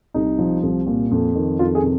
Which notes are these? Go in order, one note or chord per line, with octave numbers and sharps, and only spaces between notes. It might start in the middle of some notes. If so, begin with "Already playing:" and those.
C2 D#4
F3
C2
A#2
F2
D#3
F2 F4
G#4
C3